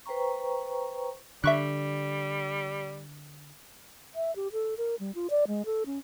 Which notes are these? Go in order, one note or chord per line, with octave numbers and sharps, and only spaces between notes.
B4 C5 G5 A#5 C#6
D3 G3 E5 C#6 F#6
E5
G4
A4
A#4
G3
F4
D5
G#3
A4
C#4